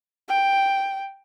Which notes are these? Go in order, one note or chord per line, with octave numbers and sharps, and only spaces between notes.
G5